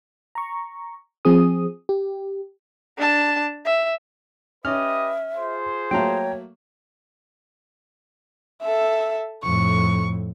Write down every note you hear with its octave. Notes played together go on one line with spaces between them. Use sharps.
A#5 C#6
F3 C4 G#4 D#6
G4
D4 A5
E5
C#4 G4 B4 D#5 E5 F6
F4 G#4 C5
F#3 A3 A#3 C#5 G5 A#5
A4 E5
F2 A2 C#6